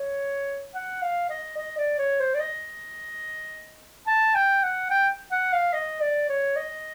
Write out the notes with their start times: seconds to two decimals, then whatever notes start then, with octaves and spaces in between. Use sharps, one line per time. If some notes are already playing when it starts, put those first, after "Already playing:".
Already playing: C#5
0.74 F#5
1.02 F5
1.30 D#5
1.57 D#5
1.78 D5
1.98 C#5
2.20 C5
2.34 D5
2.40 D#5
4.07 A5
4.35 G5
4.63 F#5
4.90 G5
5.31 F#5
5.53 F5
5.73 D#5
6.01 D5
6.29 C#5
6.56 D#5